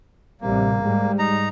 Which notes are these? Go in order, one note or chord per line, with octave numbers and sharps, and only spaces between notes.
A1 C3 G3 A#3
G#2 G3 G#3
D#4 A#5